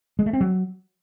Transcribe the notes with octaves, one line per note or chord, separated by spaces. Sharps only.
G#3
A3
C4
F#3